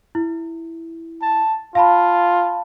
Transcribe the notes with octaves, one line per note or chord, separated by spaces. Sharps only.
E4
A5
F4 F5 A5 B5